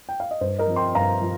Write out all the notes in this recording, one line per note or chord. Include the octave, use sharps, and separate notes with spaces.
G5
F5
D#5
G2 C5
A#4 D#5
F3 C4
G5 C6
G2 F5 A#5
F3